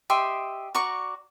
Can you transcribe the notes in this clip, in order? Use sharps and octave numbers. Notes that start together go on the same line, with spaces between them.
G4 D#5 E5 C6
F#4 D5 A#5 C#6